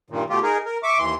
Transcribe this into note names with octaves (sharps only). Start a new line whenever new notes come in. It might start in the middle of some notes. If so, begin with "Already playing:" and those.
G2 A#2 D#3
B2 A3 F4 G4
D#4 G#4 A#4
A#4
E5 C#6 D6
D#2 E3 C6